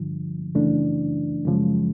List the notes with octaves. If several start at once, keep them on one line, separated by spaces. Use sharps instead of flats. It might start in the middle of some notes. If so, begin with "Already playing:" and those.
Already playing: G2 D3 F3
F#2 C#3 E3 A3 D4
F#2 C#3 F3 G#3